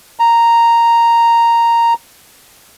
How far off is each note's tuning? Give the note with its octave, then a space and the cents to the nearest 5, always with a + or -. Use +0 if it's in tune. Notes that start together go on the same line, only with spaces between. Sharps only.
A#5 -5